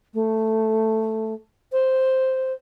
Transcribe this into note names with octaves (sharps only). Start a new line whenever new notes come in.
A3
C5